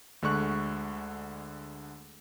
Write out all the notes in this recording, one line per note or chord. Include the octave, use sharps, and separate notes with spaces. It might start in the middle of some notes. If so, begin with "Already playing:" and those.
D2 D3 G#3 C#6 F#6